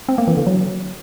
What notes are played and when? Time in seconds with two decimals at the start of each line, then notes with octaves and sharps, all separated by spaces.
0.09 C4
0.18 A#3
0.28 E3
0.37 D3
0.47 F#3